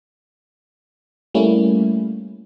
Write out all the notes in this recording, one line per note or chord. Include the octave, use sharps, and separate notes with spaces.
G3 A3 A#3 C#4 E4